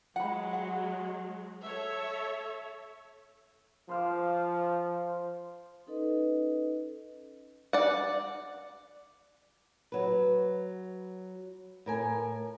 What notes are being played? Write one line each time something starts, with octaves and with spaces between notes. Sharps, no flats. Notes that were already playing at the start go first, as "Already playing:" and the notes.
F#3 G#3 F#5 B5
F#5
A4 C#5 E5
F3 C5 F5 D6
C#4 D#4 A4 B4 D#5
D5 F#5
F#3 B4
A2 A#4 G#5